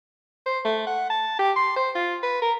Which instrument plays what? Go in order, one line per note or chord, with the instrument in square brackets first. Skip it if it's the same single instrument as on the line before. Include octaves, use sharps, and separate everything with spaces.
[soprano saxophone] C5
A3
F#5
A5
G4
C6
C5
F4
B4
A#4